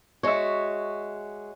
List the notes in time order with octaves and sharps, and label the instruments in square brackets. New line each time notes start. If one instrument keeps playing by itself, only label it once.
[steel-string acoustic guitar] G#3 F#4 [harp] C#5 E5